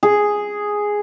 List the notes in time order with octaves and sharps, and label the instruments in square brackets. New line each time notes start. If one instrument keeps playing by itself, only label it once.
[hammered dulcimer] G#4